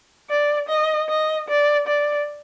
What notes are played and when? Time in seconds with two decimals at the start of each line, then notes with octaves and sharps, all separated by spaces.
0.30 D5
0.69 D#5
1.09 D#5
1.49 D5
1.88 D5